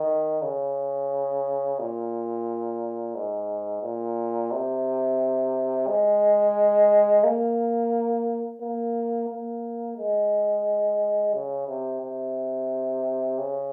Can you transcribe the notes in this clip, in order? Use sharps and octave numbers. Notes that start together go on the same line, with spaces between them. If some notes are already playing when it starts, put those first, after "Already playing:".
Already playing: D#3
C#3
A#2
G#2
A#2
C3
G#3
A#3
A#3
A#3
G#3
C#3
C3
C3
C#3